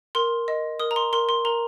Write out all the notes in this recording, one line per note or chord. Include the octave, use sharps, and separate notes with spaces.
A#4 C6
D#5
A#4 D#6
A#5
C6
A#4 C6
C6
A#4 A#5